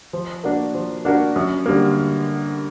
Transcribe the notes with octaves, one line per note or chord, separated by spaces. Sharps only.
F3
A#3 D4 F#4 A#4
F3
A#3 D4 F#4 A#4
F#2
D3 G3 A#3